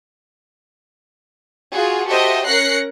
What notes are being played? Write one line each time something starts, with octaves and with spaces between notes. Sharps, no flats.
F4 F#4 G#4
F#4 G4 A4 C5 D#5 E5
C#4 A#4 F#6 A#6 C7 C#7